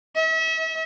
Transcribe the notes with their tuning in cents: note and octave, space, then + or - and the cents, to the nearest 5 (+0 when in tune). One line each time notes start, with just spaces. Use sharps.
E5 -40